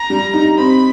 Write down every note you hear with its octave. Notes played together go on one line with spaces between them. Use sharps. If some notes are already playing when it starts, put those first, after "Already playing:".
Already playing: A#5
G3
D#4
C4 B5